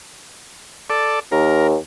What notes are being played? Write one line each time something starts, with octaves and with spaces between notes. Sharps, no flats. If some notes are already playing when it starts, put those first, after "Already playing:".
A4 D5
D#2 A#4